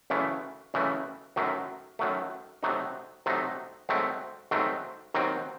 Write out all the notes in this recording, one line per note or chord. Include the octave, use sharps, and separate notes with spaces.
F#2 C#3 E3 A3
F#2 C#3 E3 A3
F#2 D#3 F#3 A3
F#2 D#3 F#3 A3
C3 F#3 A3 D#4
C3 F#3 A3 D#4
G#2 D#3 F#3 A3 C4
G#2 D#3 F#3 A3 C4
D#2 D#3 F#3 C4